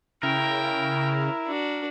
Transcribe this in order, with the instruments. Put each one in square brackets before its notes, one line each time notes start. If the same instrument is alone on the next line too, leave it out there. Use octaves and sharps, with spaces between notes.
[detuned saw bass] C#3 [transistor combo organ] E4 [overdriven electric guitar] A#4 [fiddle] G5
[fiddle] D4 F#4